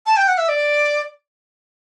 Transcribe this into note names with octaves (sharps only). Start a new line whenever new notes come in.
A5
G5
F#5
E5
D5